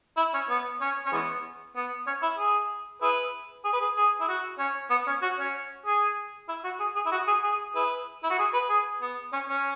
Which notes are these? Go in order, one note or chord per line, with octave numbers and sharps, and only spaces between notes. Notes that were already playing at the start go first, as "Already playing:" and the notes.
E4
C#4
B3
C#4
C#4
E3 G#3 B3
B3
C#4
E4
G#4
E4 G#4 B4
G#4
B4
G#4
G#4
E4
F#4
C#4
B3
C#4
F#4
C#4
G#4
E4
F#4
G#4
G#4
E4
F#4
G#4
G#4
E4 G#4 B4
E4
F#4
G#4
B4
G#4
B3
C#4
C#4